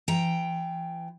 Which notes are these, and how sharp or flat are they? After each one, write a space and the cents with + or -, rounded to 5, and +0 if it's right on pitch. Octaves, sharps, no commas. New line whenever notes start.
E3 +40 G5 +0 A#5 +0